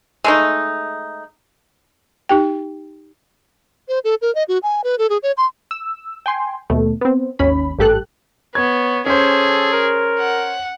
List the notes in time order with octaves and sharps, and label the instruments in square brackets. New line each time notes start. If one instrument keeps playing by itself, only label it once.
[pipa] G#3 A3 D#4
[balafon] D#4 G4 G5
[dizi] C5
A4
A#4
D#5
F#4
G#5
B4
A4
G#4
C#5
C6
[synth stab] E6
G5 G#5 C6
D#2 B2 A3
B3 C4
G#1 D#2 C#4 B5
A1 G2 G4 A4 F#6
[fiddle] B3 [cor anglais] C#5 [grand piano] G#6
[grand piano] C#4 C5 [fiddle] G#4 [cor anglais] A4
[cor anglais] A#4
[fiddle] F#5